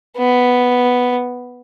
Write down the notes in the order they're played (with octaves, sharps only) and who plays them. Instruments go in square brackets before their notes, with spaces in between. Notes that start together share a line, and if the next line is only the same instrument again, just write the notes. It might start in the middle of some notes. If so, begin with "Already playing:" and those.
[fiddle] B3